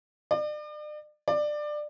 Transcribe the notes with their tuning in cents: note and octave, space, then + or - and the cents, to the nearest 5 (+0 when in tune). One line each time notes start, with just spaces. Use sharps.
D5 +40
D5 +20